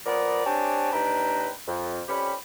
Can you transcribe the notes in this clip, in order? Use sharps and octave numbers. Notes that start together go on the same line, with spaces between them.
F3 A#3 B3 A#4 B4 D5
C4 D4 G4 C#5 G#5 A5
D#2 E3 D4 B4 G5 A#5
F2
F2 G3 C#4 G4 B5